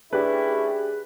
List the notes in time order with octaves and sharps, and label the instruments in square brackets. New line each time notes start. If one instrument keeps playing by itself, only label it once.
[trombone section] A3 C#4 E4 [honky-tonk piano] D4 G4 [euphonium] G#4 [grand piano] B4